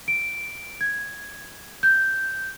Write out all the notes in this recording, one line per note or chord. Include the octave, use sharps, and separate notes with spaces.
D7
G#6
G6